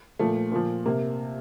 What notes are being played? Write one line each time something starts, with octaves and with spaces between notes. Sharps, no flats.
A#2 F3 A3
A#2 F3
C3 A#3